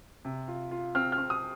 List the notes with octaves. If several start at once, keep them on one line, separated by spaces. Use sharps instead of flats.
C3
F4
F4
C4 F6
F6
C4
D#6